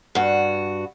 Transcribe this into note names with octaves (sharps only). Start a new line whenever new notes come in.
G2 F#4